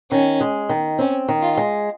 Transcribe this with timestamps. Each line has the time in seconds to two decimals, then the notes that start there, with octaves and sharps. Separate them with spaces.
0.11 D#3 C#4
0.41 G#3
0.69 D#3
0.99 C4 C#4
1.28 D#3
1.42 F4
1.57 G#3